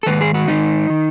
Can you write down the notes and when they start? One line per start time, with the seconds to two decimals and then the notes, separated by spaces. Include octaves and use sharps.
0.03 A4
0.06 G#2 D#3 B4
0.21 G#4
0.34 F#4
0.48 G#2 D#3 D#4
0.90 D#3